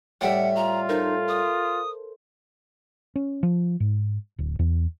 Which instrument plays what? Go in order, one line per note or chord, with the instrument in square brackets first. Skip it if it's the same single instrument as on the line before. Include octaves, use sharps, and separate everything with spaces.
[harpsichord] A2 G3 [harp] D5 E5 [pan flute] F#5
[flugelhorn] F4 [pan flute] A#5
[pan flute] D#4 [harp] A4 A#4 C5
[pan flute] D#6
[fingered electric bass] C#4
F3
G#2
D1
E2